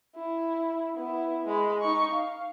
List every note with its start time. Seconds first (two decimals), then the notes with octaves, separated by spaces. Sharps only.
0.16 E4
0.97 B3 E4
1.45 G#3 B5
1.82 D#4 C#6
2.13 F5